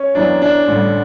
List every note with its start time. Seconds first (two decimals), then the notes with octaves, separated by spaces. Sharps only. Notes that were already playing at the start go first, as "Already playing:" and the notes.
Already playing: C#4
0.15 F#2 E3 B3 D4
0.42 D4
0.68 A1 G2 D3